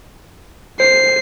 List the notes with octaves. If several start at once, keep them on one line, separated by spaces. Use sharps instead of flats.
C5 C7